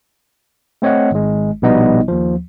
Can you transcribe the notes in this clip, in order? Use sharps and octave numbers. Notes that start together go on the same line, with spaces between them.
A3 C4 C#5 D#5 F#5
G#1 G#3
A#1 B2 G3 B3 D#4 D#5
D#2 F3